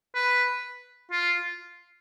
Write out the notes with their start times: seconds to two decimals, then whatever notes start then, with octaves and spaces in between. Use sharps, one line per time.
0.15 B4
1.12 F4